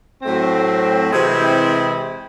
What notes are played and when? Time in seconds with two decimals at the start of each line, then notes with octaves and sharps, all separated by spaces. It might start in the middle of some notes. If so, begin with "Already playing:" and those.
0.22 A2 F#3 A3 C4
1.10 C3 E3 G#3 C4 E4